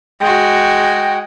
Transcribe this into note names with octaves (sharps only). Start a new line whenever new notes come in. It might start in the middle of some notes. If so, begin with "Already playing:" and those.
G#3 F#4 G5